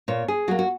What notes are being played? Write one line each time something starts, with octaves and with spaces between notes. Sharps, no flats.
A#2 C#5
G#4
F#3 A#3 F#4
F#4